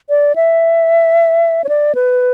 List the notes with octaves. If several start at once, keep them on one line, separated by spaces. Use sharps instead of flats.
D5
E5
C#5
D5
B4